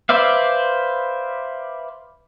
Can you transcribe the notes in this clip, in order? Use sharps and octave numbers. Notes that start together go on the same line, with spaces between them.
B4 C5 D5 E5 F5